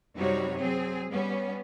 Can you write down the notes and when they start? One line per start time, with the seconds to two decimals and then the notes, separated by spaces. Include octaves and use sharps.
0.15 F#2 C3 G3 D#4 F#4 C#5
0.59 F#3 C4 G#4
1.09 G3 B3 C#4